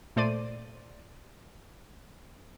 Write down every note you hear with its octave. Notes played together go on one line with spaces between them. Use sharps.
A#2 A3 C5 D5 D#7